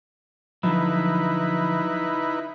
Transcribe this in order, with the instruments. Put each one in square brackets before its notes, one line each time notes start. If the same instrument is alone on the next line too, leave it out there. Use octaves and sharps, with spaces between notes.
[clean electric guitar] D3 F3 F#3 [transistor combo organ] D#4 E4 B4